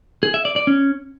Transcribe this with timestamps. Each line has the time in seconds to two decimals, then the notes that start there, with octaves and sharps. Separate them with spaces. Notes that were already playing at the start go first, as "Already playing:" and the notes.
0.23 G#4
0.34 E5
0.45 D5
0.56 D5
0.67 C#4